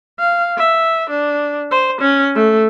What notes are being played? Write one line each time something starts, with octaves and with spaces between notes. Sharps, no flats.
F5
E5
D4
C5
C#4
A3